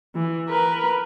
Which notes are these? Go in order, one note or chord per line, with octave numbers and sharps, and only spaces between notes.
E3
A#4 B4